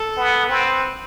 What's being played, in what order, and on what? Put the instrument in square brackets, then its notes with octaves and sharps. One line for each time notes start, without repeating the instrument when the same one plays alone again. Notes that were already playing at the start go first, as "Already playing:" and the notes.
Already playing: [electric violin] A4
[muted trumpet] B3
[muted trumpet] C4 [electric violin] B4